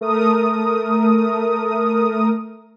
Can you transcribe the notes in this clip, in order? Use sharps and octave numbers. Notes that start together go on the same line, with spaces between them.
A3 A#4 D#6